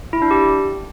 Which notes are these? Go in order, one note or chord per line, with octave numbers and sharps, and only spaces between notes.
E4
D4
G4